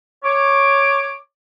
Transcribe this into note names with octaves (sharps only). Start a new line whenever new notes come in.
C#5 D6